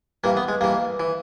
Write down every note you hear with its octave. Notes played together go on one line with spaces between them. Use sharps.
G2 E3 A#3
B3
G#3
G2 E3 A#3
E3